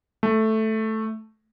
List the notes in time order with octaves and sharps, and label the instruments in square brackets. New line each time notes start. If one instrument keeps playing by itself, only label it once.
[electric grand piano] A3